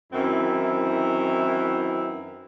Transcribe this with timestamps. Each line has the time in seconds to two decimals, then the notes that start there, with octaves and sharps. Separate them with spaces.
0.13 F#2 D#3 E3 C4 E4